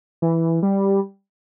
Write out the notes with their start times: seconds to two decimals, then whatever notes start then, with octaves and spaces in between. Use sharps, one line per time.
0.22 E3
0.63 G3